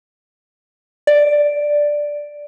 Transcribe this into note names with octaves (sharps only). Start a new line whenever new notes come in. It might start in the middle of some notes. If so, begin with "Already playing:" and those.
D5